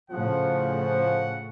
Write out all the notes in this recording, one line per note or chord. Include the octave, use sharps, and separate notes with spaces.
A2 C#3 F3 F#5